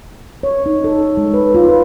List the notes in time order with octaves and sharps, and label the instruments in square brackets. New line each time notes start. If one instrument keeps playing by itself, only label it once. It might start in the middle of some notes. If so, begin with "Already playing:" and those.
[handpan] C#5
D#4
A4
G#3
B4
F4
B4